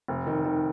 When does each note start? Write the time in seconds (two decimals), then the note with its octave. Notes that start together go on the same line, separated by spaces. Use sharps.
0.08 F1
0.27 D#3
0.45 D#3